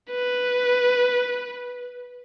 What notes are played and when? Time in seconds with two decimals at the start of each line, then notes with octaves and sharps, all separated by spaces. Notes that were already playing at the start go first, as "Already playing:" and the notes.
0.11 B4